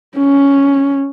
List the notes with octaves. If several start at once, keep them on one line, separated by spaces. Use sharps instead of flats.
C#4